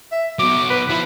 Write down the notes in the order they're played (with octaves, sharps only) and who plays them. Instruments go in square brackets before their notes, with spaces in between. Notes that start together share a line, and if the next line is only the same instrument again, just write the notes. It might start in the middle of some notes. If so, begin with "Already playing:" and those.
[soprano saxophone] E5
[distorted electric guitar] B2 F#3 [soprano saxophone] D6
[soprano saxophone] B4
[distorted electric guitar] F3 [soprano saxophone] E4